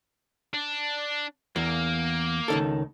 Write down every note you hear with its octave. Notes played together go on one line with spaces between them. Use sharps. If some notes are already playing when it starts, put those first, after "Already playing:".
D4
E2 A#3
C#2 D#3 A4